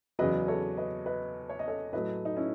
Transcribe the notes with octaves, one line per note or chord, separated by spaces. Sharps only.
E2 C#3 F#3 B4 D#5
A4 C#5
B4 D#5
B4 D#5
C#5
D#5
A4 C#5
A2 F#3 A3 B4 D#5
D#4
C#4 E4